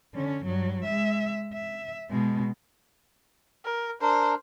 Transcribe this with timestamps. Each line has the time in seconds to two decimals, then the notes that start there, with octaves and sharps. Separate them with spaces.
0.14 D3 C#4
0.44 G2 F#3
0.84 G#3 E5
1.54 E5
2.10 B2 G#3
3.65 A#4
4.02 D4 A#4 C5